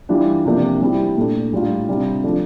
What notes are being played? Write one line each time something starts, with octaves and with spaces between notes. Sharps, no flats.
E3 G3 D4 F4
C3 F3 A#3 D4
G3 C4 E4 G4
A#2 A3 D4
A2 G3 D4 F4
C3 G3 D4 F4
F3 A3 D4